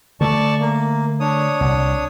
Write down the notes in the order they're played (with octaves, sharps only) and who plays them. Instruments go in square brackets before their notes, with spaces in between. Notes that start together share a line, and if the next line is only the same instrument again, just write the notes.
[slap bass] D3 A3 [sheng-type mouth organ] D5 A5 C#6
[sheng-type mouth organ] A#3
D4 C#5 D#6
[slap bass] C2